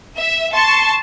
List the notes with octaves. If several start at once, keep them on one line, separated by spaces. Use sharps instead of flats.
E5
A5 C6 C#6